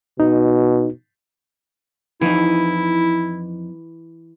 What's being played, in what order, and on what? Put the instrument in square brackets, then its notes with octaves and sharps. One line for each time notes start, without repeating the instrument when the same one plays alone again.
[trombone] B2 [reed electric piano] D#4
[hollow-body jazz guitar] F2 D#4 [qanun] E3 [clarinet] E4